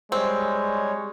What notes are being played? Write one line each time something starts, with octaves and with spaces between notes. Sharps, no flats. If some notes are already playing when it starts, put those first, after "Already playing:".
G3 G#3 C4 C#5